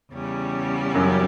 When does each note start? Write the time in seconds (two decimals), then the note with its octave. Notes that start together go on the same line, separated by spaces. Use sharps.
0.11 E2 C#3 G3 C#4
0.94 F#2 F#3